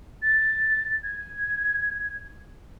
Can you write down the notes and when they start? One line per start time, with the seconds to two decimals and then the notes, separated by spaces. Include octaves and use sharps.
0.22 A6
1.03 G#6